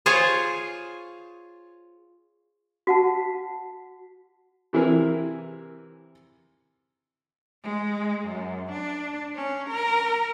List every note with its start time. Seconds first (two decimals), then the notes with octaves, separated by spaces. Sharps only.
0.06 F4 G#4 C5 C#5
2.87 F#4 F#5 A5
4.73 C3 E3 E4 G#4 A#4
7.64 G#3
8.26 F#2
8.72 D4
9.35 C#4
9.70 A#4